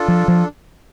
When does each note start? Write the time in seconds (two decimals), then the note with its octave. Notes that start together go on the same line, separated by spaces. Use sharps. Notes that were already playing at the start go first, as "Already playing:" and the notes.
Already playing: D4 F4 A4
0.08 F3
0.28 F3